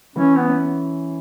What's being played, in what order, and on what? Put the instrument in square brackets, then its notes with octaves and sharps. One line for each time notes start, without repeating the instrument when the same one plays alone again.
[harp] E3 [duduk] C#4
[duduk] B3
[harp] C#4